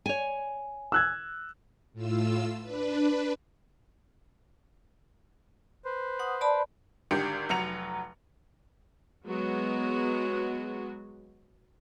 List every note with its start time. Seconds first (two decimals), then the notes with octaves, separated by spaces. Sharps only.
0.06 C#5 G#5
0.92 E6 F#6 G#6
1.93 A2 F4 E6
2.61 D4 B4
5.85 B4 C5
6.19 F#5 D#6
6.41 D5 A5 B5
7.11 G#1 D3 G4 C#7
7.49 F1 F#3 C#7 F7
9.25 F#3 G#3 B3 F#4